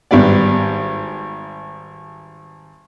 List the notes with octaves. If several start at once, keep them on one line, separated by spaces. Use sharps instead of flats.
G#1 G3 B3 D5